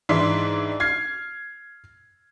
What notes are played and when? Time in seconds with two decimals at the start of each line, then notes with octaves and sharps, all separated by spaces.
0.09 G#2 E3 D4 E5 C6 B6
0.80 F6 G#6 C7